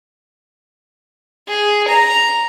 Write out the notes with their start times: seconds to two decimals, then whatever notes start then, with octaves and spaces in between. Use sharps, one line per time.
1.48 G#4
1.89 A#5